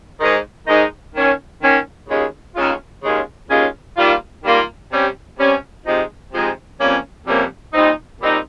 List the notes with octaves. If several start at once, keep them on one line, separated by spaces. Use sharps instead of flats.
G#2 D#3 G#3 D#4
G#2 D#3 G#3 D#4
D#3 A#3 C#4
D#3 A#3 C#4
D#2 C#3 G#3 C#4 F4
D#2 C#3 G#3 C#4 F4
D#2 C#3 G#3 C#4 F4
D#2 C#3 G#3 C#4 F4
D#3 G3 A#3 F4
D#3 G3 A#3 F4
C3 G3 C#4
C3 G3 C#4
C3 F3 G#3 D#4
C3 F3 G#3 D#4
F2 C3 G3 A#3 C#4
F2 C3 G3 A#3 C#4
A#2 G3 C4 D#4
A#2 G3 C4 D#4